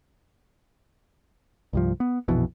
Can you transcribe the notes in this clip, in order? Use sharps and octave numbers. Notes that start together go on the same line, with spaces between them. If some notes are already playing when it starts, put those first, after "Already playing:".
C2 G2 F3
B3
A#1 F2 B2 E3